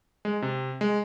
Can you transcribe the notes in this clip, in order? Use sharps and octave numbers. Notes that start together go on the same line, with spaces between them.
G#3
C3
G#3